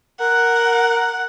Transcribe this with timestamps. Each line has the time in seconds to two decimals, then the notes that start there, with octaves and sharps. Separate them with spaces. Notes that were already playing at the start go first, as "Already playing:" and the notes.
0.20 A#4 F#5